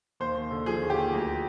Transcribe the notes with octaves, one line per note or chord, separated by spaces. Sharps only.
D#2 C5
D#2
D3
F3 G#4
D#2
G4
D#2
D2